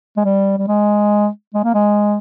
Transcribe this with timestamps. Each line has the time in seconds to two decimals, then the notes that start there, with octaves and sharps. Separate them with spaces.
0.17 G#3
0.25 G3
0.58 G3
0.68 G#3
1.54 G#3
1.64 A#3
1.74 G#3